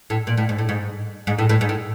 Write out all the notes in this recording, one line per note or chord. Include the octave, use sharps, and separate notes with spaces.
A2
A#2
A2
G#2
A2
G#2
G#2
A2
A2
G#2
A2